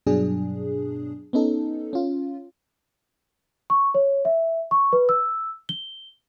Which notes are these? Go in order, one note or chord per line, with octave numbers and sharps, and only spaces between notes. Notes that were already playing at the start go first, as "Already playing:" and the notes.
G2 B2 F#3 D4 G#4
B3 C#4 D#4 A4
C#4 F4
C#6
C#5
E5
C#6
B4
E6
G7